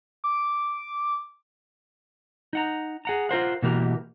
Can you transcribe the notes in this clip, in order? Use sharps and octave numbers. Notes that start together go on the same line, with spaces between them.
D6
D#4 F#5 A#5
G#4 F#5 A#5
F4 A#4 C5 F#5
B2 E3 A#3 F#4 G4 A#4